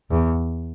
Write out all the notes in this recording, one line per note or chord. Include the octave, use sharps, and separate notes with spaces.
E2